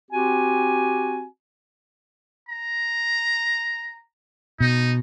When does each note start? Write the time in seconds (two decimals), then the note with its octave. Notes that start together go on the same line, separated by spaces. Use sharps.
0.11 C4 F#4 G4 G#5
2.49 A#5
4.60 B2 D#4